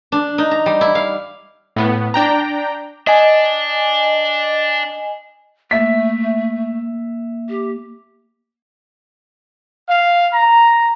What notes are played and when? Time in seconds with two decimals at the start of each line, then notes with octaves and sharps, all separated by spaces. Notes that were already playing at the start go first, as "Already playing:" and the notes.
0.12 D4
0.38 D#4
0.51 A#5
0.66 G3
0.81 E4
0.95 F5
1.76 A2 B3
2.14 D4 G5 A#5
3.07 D4 D#5 G#5
5.71 A3 A#3 E5 B6
7.49 G4
9.89 F5
10.33 A#5